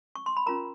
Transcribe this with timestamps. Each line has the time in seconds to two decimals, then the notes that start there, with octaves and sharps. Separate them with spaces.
0.15 C#6
0.26 C6
0.37 B5
0.46 C#4 F4 A#4 A#5